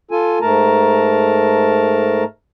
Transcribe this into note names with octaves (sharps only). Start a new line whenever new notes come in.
F4 A4 G#5
G#2 A3 A#4 A5 A#5